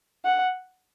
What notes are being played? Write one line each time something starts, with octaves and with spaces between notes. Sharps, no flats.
F#5